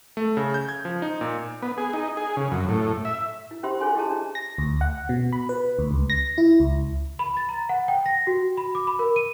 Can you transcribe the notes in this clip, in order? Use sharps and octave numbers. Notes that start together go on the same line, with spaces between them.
A3
C#3
G6
G#6
F3
D#4
A#2
B3
G#4
D#4
G#4
C#3
F#2
A2
E5
E4
C#4 G4 C5 E5 B5 C6
F4 G#4 A4 C#5 G#5 C6
E4 G4 G#4 D#5 A5 A#5
D4
A#6
D2
F#5
B2
B5
B4
D2
C#2
A#6
E4
C#2
B5
A6
A#5
F#5
G5
A#6
F#4
B5
D6
B5
A#4
D#7